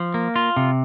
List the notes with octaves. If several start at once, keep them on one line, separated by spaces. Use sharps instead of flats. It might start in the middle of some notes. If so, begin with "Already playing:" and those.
Already playing: F3
A#3
F4
C3